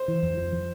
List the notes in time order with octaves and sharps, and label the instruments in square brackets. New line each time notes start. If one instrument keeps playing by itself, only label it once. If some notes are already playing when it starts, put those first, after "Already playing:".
Already playing: [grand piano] C5
[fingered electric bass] E3
F2
F3
F3